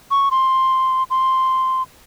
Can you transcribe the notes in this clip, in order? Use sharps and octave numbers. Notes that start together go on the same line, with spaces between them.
C#6
C6
C6